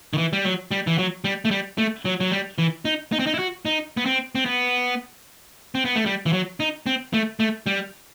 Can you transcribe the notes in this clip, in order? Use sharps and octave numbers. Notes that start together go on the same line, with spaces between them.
D#3
E3
G3
F#3
G3
E3
F#3
G3
A3
G3
A3
F#3
F#3
G3
E3
D#4
D#4
C4
D#4
E4
F#4
D#4
B3
C4
C4
B3
C4
B3
A3
G3
E3
F#3
D#4
C4
A3
A3
G3